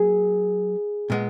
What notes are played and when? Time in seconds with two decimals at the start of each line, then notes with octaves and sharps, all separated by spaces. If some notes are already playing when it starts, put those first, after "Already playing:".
Already playing: F#3 A#3 G#4
1.10 A#2 G#3 B3